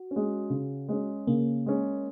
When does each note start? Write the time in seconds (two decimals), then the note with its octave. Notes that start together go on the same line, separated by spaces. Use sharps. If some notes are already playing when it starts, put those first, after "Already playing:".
Already playing: F#4
0.11 C#4
0.16 G#3
0.50 C#3
0.89 G#3 C#4
1.27 C#3 A#3
1.66 G#3 C#4